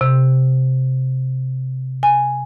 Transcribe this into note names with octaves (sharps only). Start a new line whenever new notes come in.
C3
G#5